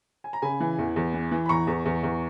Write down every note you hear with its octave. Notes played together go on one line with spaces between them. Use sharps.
G#5
A#5
C#3 G#5 B5
E3
E2
E2
E3
E3
B5
E2 A#5 C#6
E2
E2
E2